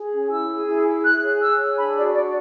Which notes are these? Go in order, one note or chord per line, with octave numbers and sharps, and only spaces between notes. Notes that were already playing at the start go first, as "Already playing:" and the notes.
Already playing: G#4
C#4
E4 E6
G#4
E4
G#4
G#4 F#6
C#5
C#5 E6
G#4
D4 B5
F#4 D5
D4 D5